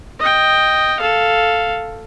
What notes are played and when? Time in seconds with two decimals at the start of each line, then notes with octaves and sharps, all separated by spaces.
0.19 D#5 G5
1.00 A4 F5